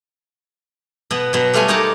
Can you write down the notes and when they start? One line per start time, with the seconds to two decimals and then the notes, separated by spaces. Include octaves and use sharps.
1.11 B2 B3
1.33 B2 F#3
1.53 G3 A3 F4 C#5 G#5
1.68 A#3 D#4 C#5 D5 A5 A#5